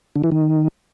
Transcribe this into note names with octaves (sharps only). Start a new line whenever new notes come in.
D3
E3
D#3